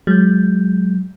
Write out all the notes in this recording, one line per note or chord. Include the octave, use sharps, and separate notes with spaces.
F#3 G#3 G6